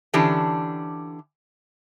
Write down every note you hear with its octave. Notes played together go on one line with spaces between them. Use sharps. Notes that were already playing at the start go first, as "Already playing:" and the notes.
D3 E3 C#4 D4 G4 A5